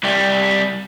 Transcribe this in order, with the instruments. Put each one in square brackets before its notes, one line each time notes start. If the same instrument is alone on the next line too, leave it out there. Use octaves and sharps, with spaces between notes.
[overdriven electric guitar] C2 G3